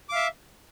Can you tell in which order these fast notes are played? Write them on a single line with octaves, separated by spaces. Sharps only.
D6 F5 E5